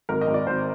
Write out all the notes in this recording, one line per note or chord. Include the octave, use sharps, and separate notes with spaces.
G#1 A#4
D#5
G#1
D5
G#1 C5